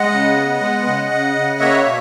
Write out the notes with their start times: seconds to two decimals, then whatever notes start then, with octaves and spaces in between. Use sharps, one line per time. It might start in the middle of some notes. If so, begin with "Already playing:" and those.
Already playing: G#3 D#5 F#5
0.12 C#3
0.36 B3
0.61 G#3
0.86 C#3
1.11 C#3
1.36 C#3
1.60 A#3 C#5 E5
1.85 B2